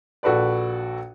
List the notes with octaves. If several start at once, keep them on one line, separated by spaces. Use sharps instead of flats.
A#1 F#4 A4 B4 D5